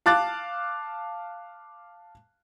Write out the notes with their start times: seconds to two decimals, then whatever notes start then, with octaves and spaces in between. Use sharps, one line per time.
0.06 F5 A5 D6 F#6 A6